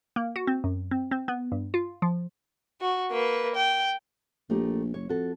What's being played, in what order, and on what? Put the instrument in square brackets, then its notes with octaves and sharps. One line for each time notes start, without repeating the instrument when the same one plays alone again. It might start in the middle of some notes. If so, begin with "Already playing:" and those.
[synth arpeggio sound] A#3
F#4
C4
F#2
C4
C4
B3
G2
F4
F3
[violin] F#4
A#3 B4
G5
[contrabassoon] A#1 [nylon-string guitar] A3 D#4 G4
[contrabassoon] F#1 [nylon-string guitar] C#5
[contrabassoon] F2 [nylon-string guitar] F#4 A4